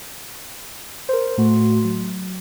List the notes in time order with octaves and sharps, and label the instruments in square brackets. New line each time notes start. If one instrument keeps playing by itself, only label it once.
[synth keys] A#4 C5
A2 A3 F#4 C6
F#3